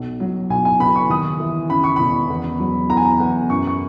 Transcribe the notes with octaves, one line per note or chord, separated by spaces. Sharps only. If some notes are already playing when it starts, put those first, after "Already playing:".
Already playing: B1
F#3
B1 G#5
G#5
B2 B5
C#6
D#2 D#6
E3
C#3 B5
C#6
E1 B5
E2
F#3
E2 A#5
G#5
A#5
E2
F#2 C#6
C#6